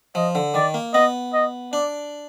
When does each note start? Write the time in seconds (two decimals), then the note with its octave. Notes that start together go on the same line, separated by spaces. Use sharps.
0.15 F3 D#5
0.35 D3
0.54 D#3 D5
0.74 A#3
0.93 B3 D#5
1.33 D#5
1.73 D4 D5